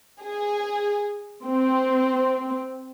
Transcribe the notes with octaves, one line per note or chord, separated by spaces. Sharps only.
G#4
C4